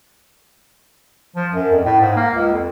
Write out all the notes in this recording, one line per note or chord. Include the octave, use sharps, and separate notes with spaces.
F3
F#2
F2
A2
G#2
A#3
C#2
F2